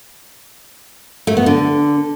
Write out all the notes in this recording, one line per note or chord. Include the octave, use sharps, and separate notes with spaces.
A3
B3
D3